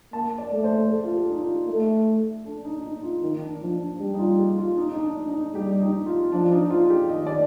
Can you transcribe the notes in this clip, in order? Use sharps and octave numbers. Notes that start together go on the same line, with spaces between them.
A#3 A5
D5
A3
C5
A4
F4
G4
D#4
F4
A3
D4
D#4
D#4
F4
D#3 D#4
D4
F3 D4
D4
G3
D#4
F4
G4
F4
D#4
D#4
D4
D#4
G3 G4
D#4
F4
F3 D4
D#4
F4
G4
D#3 D#5
D5